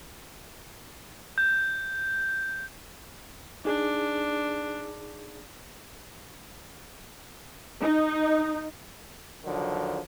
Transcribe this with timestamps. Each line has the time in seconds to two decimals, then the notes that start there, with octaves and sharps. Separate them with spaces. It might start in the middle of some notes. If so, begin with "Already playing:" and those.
1.38 G6
3.65 D4 D#4 G#4
7.81 D#4
9.44 D3 D#3 F3 F#3